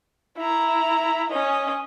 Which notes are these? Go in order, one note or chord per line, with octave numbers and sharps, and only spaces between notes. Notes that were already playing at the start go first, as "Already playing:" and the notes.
E4 A#5
C#4 D#5